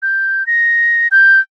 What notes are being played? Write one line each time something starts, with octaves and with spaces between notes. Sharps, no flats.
G6
A#6
G6